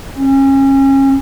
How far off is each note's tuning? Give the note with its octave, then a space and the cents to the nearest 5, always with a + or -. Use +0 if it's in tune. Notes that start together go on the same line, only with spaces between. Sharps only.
C#4 -30